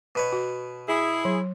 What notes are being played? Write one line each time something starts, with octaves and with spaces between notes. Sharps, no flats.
B2 B4 C#5
F#4
E4 G#4
F#3